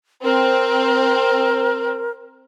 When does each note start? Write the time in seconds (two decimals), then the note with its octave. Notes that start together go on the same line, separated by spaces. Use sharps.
0.24 C4 A#4